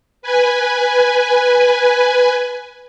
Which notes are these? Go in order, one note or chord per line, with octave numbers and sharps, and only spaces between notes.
B4 G#5